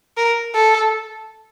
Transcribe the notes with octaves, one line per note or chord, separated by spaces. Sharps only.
A#4
A4